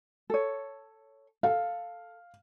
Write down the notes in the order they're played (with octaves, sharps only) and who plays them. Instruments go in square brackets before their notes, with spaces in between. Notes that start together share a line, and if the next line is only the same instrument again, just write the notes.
[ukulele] A4 C#5
[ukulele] A4 [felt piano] F5